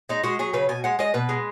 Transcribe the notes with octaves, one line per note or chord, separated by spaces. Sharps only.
G#3 D#4
G#3 F#4
F#3 G#4
C#3 B4
B2 G#5
G#3 F#5
G#3 D#5
B2 B4
G#3